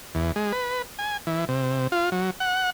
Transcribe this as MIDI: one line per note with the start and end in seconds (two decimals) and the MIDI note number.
0.15 0.32 40
0.36 0.52 56
0.52 0.82 71
0.99 1.17 80
1.27 1.45 52
1.49 1.87 48
1.92 2.10 65
2.12 2.30 54
2.40 2.70 78